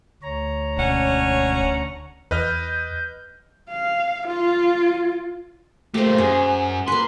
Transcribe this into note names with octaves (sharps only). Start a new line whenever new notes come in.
D2 C#5 A#5
E1 C#4 D4 F#5
E2 B4 D#5 F6 G6
F5
F4
A3 A#3 G4 C5
F#2 G#4
A#3 B4 C6